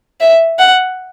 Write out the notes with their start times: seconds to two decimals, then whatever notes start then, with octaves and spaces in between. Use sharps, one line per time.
0.20 E5
0.59 F#5